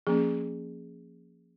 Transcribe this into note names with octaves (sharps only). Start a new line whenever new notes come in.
F3 A#3 C#4 G#4